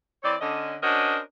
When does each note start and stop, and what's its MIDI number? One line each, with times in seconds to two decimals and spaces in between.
0.23 0.35 52
0.23 0.35 60
0.23 0.35 73
0.23 0.35 74
0.40 0.75 50
0.40 0.75 61
0.40 0.75 75
0.82 1.18 61
0.82 1.18 62
0.82 1.18 66
0.82 1.18 70
0.82 1.18 72
0.82 1.18 75